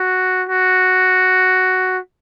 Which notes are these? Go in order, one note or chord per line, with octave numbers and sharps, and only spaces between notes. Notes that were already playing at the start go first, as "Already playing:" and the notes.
Already playing: F#4
F#4